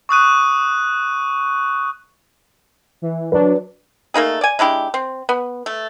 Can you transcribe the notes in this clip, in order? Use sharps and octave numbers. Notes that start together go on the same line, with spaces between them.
C#6 D#6 F#6 D#7
E3
F#3 D4 B4
A3 A#3 D#4 G#4
D5 G#5
G#3 D4 E4 G4
C4
B3
A3